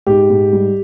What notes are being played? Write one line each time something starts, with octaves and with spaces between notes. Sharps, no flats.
G#2 G4
G#2
G3